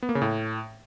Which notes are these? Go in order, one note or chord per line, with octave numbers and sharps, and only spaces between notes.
B3
A#3
C#3
A2